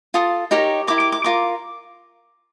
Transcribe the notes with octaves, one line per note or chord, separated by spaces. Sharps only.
F4 A4 D#6
D#4 G4 A#4 C#5
E4 G4 A#4 D6
D6
D6
F4 A#4 D6